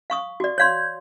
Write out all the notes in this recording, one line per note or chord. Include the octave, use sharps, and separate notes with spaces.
F5 C#6 D#6
F#4 D5
C#5 F5 C6 G6 G#6